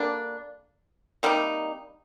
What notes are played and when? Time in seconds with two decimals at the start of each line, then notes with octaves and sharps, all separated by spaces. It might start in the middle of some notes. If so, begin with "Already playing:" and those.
Already playing: D3 G3 A#3 D4
1.23 C3 G3 A#3 D#4